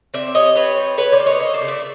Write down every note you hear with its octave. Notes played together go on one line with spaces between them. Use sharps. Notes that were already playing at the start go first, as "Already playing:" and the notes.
C4 D5 E5
G3 C#5 D#5
C4 B4 C#5
G3
C#3 B4 C#5
C5 D5
A#3
C#5 D#5
A#3 C#5 D#5
C5 D5
C#3
D5 E5